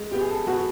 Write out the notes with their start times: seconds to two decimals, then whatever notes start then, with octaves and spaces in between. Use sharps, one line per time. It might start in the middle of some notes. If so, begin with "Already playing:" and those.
Already playing: G#3
0.11 B3 G4
0.21 G#4
0.31 A4
0.47 B3 F#4